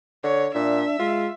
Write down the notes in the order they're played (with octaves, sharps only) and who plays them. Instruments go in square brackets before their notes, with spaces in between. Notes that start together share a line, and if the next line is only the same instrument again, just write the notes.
[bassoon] D3 [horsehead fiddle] C#5
[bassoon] A#2 [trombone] D4 [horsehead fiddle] E5
[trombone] G#3 [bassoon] F4